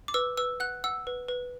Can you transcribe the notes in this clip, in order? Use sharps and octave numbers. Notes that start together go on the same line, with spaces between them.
D6
B4 E6
B4 E6
F#5 F#6
F#5 E6
B4
B4